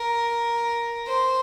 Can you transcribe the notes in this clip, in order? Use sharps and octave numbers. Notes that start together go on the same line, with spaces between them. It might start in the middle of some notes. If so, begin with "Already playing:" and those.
Already playing: A#4
C5